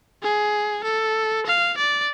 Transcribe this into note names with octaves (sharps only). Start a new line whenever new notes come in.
G#4
A4
F5
D5